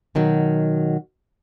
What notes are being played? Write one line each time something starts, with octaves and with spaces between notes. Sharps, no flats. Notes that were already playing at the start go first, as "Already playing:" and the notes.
B2 D#3 F#3